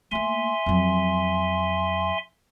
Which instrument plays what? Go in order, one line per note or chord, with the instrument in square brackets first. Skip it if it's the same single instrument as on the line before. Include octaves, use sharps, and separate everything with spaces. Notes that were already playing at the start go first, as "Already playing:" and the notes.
[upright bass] A3 A#3 [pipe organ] E5 G#5 C6
[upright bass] F2 F#3